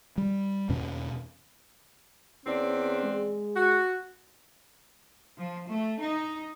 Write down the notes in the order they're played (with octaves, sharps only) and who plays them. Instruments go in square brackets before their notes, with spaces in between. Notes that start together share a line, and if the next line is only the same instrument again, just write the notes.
[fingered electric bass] G3
E2 B2 C#4
[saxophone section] E2 C4 D5 [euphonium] C#4
[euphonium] G#3
[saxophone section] F#4
[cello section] F3
A3
D#4